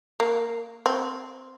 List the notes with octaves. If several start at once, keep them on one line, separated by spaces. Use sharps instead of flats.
A#3
C4